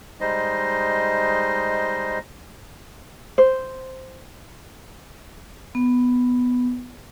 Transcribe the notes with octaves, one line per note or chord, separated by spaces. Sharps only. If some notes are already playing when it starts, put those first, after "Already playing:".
G3 G#3 D#4 C5 D#5
C5
B3